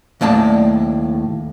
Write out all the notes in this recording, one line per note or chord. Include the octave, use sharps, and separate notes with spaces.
D#2 A2 D5 A5